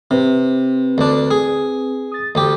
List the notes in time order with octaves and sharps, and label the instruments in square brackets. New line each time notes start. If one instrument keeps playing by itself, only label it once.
[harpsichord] C3 [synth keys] C4 B4
[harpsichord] D2 D4
G#4
[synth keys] D#6 A6
[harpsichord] D2 G4 [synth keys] D#6